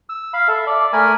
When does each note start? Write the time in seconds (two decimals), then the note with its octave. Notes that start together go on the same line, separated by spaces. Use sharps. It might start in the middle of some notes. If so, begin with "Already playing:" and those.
0.09 E6
0.34 F5 B5
0.48 A4 E5
0.67 D5
0.93 A3 A#4 G#5 B5